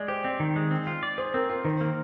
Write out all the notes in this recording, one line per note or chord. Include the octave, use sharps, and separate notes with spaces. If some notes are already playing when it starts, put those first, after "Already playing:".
Already playing: G#3 D5 D#5
G4 C5
C4 D5
D#3
G#3
C4
F4
D5
G#4 C5
C4 A#4
F4 A#4
D#3 C5
A#3